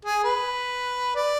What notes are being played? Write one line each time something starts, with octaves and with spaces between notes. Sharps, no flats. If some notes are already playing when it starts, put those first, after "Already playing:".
G#4
B4
D5